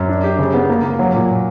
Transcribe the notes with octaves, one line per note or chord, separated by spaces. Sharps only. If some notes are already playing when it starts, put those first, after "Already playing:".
Already playing: F#2
D4
G4
C#3
B3
A#3
A#3
F#3
A#2